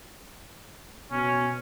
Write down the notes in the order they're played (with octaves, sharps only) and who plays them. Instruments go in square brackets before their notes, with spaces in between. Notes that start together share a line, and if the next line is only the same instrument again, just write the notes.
[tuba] B2 [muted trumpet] C#4